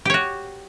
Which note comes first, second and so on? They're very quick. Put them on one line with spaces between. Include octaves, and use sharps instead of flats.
G4 C#5 F#4